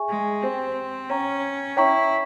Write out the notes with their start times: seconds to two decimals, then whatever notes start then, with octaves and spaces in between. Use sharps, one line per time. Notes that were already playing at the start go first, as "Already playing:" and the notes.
Already playing: G#4 E5 G#5 C#6
0.09 G#3
0.42 C4 G4 C5 G5
1.10 C#4 C#5 G5 A#5 C#6
1.77 E4 C#5 G5 A#5 C#6